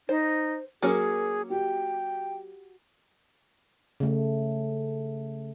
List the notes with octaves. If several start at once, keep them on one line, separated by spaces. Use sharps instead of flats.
D#4 C5
F#3 A#3 C#4 F#4 G#4 A#4
F#4 G4 G5
C#3 A3